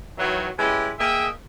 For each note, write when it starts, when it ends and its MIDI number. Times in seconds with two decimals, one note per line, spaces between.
0.18 0.48 51
0.18 0.48 52
0.18 0.48 54
0.58 0.91 56
0.58 0.91 61
0.58 0.91 64
0.58 0.91 67
0.58 0.91 71
0.99 1.27 58
0.99 1.27 68
0.99 1.27 75
0.99 1.27 76
0.99 1.27 79